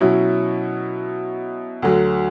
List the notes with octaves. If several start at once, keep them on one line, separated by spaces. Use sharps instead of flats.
B2 F#3 C#4 E4
D2 D3 F#3